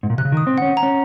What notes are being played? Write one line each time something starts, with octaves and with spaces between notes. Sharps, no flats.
G#2
A#2
C3 F#6
C#3
D#3 D#6
C4
C#4 F#5
A#5
C#4